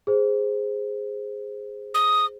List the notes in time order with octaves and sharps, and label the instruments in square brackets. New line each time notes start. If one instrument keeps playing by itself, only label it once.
[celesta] G#4 C5
[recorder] D#6